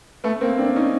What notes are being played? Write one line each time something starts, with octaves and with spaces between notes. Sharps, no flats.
A3 B3
A#3 C4
C4 D4
C#4 D#4